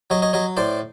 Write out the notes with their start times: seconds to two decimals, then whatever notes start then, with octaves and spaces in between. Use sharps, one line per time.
0.10 F#3 C#5 D#5
0.22 C#5 D#5
0.33 F#3 C#5 D#5
0.57 A2 C5 D5